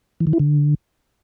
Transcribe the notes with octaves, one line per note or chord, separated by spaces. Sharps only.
E3
D#3
E4
D3